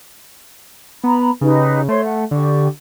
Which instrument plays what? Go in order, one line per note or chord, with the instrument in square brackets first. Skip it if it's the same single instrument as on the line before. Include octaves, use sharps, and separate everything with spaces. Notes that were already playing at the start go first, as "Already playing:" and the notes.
[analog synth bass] B3 [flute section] A#5 B5
[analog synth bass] C#3 [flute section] D#4 G4 B4
[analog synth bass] A3 [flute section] C5 C#5 C6
[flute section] F#5
[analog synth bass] D3 [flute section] G4 D5 C#6